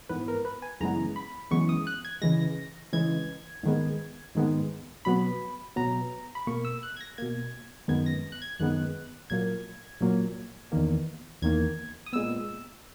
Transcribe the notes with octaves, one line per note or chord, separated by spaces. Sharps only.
G#2 E3 B3 B4
A#4
B4
G#5
F#2 C#3 E3 G#3 B3 A#5
B5
F#2 C#3 E3 G#3 B3 C#6
D#6
F#6
G#6
C#3 E3 G#3 A#6
C#3 E3 G#3 G#6
G#2 D#3 G#3 B3
G#2 D#3 G#3 B3
B2 F#3 B3 B5
B2 F#3 B3 A#5
B5
B2 A#3 C#6
E6
F#6
G#6
A#6
B2 A#3 G#6
F#2 D#3 G#3 B3 G#6
A#6
F#6
G#6
F#2 D#3 G#3 B3 F#6
A#2 F#3 A#3 G#6
A#2 F#3 A#3
E2 D#3 A#3
E2 D#3 A#3 G#6
D#6
A#2 G#3 B3 E6